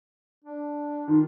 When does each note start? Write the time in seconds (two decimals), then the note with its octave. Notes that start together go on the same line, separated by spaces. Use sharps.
0.44 D4
1.08 D#3 F4